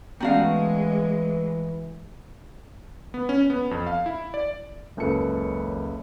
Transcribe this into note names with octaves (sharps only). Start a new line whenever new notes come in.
E3 G#3 A3 B3 C#4 F#4 D5 F5
B3
C#4
B3
F2
F5
E4
D5
F#1 C#2 A4 B4 C#7